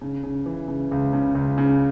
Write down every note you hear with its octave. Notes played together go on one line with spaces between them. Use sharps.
C#3
C#3
E3
C#3
C#2
C#3
C#2
C#3